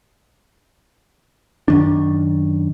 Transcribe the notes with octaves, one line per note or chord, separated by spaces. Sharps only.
F#2 D#3 D4